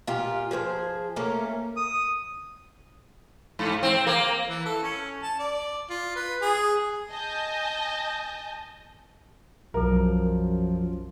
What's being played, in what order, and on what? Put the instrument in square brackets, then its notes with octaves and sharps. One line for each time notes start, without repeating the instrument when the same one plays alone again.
[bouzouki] A#2 F4 G4
F3 G#4 B4 C5
A3 A#3 C#4 A#4
[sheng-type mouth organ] D#6
[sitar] G#2
C4
A#3
[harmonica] E3
A4
C#4
A5
D5
F4
B4
G#4
[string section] D#5 G#5 A5 G6 A#6
[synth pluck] B1 F#3 [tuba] F#2 [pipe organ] F3 [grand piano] A#4